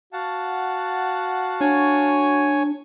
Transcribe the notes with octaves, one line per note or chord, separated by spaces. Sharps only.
F#4 F5 F#5 A5
D4 C#5 G#5